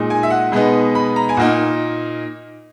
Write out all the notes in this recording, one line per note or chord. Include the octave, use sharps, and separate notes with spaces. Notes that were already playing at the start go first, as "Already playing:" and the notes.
Already playing: A#2 G#3 D#4
G#5
E5
F#5
B2 G#3 B3 D#4
B5
A#5
G#5
A#2 A#3 D#4 F#5